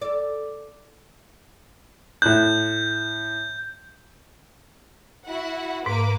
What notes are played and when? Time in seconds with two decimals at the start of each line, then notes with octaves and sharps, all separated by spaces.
0.01 A4 D5
2.22 A2 F#6 G6
5.27 E4 F#4 F#5
5.86 G#2 A#3 B4 D6